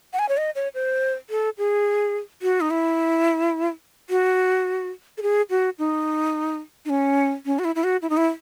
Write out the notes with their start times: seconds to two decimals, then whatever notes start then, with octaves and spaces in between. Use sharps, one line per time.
0.13 F#5
0.19 G#5
0.29 C#5
0.37 D#5
0.55 C#5
0.74 C5
1.30 A4
1.58 G#4
2.42 F#4
2.61 D#4
2.70 E4
4.10 F#4
5.18 A4
5.22 G#4
5.50 F#4
5.79 D#4
6.85 D#4
6.90 C#4
7.46 C#4
7.59 F#4
7.65 E4
7.75 E4
7.84 F#4
8.02 E4
8.10 D#4
8.17 E4